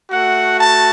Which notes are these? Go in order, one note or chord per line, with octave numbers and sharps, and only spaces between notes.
A3 F#4 F#5
A5